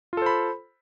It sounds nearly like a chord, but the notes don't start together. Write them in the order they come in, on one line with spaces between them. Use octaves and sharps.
F4 A4 C5 B5